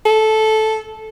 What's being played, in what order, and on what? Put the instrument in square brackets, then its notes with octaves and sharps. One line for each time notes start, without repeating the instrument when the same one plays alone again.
[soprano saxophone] A4